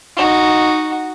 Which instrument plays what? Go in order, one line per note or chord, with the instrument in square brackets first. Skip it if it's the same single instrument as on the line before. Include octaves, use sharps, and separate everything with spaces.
[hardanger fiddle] D#4 F#4